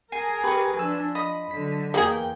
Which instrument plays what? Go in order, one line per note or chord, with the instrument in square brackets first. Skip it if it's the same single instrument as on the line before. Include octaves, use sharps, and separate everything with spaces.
[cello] G#4 A#4 [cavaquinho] G#5 [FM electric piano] C7
[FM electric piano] G4 [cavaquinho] B4 C#6
[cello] F3 D4 [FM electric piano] G#5 E6
[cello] F3 [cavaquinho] D#5 D#6 [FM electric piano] B5
[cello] D3 F#3 [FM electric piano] B6
[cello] E2 G5 [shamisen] A#3 G4 G#4